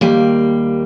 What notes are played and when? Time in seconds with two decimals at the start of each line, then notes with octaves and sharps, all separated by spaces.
0.01 D#2 G3 A#3